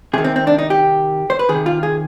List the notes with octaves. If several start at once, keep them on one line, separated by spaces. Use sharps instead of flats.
C3 D#3 G#4
C4
C4
D4
D#4
G4
C5
B4
C3 D#3 G#4
F4
G#4